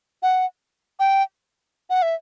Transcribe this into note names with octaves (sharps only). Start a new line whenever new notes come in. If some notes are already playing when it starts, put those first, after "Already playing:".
F#5
G5
F#5
E5